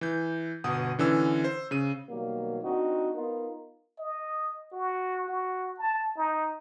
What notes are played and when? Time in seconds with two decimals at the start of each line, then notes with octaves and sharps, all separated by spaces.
0.01 E3 G6
0.64 G1 B2 F#5 D#6
0.99 D3 E3 C#4 E6
1.44 C5
1.71 C#3 D#7
2.09 B2 D#3 F#3 G3 A#3
2.62 C4 D4 D#4 F#4
3.15 B3 D#4 F4 A#4
3.99 D#5
4.72 F#4
5.28 F#4
5.79 A5
6.17 D#4